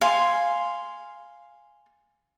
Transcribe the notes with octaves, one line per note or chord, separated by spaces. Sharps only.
F5 G#5 C6